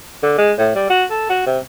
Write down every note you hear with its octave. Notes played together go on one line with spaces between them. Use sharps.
D3
G#3
A2
G3
F#4
A4
F#4
C3